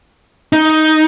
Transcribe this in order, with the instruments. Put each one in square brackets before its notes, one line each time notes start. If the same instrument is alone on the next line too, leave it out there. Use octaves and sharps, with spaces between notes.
[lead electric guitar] D#4